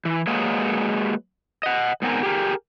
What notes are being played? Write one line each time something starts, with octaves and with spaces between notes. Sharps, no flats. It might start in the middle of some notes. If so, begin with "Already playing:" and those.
E3
F#3 G#3 A#3 B4 C#5 D#5
D#5 F#5
G#2 B3 C4 A#4 G#5
G4 G#4 A#4